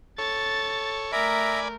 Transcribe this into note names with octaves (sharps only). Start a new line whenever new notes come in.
A4 C#5 A6
A3 A#4 D5 E5 G#5 A#5 B5